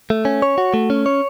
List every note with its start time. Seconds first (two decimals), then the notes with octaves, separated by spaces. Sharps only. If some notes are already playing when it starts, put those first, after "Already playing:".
0.10 A3
0.25 C#4
0.42 C#5
0.58 F#4
0.74 A3
0.90 C#4
1.06 C#5